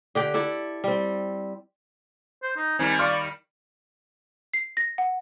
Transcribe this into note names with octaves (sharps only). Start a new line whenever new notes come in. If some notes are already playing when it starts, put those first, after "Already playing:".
D3 G4 G5
E4 A4 D5
G3 C4
C5
D#4
D#3 G3 C4 G#5
D5 F5 C#6 F6
C7
A#6
F#5